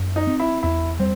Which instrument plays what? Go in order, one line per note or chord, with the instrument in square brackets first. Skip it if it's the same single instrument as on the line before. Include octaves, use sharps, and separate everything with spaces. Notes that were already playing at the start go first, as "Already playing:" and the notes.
Already playing: [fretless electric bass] F#2
[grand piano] D#4
[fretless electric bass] C4
[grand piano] E4
[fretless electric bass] E2 [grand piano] E4
[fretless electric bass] G3 [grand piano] C4